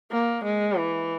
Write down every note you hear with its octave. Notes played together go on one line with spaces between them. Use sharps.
A#3
G#3
E3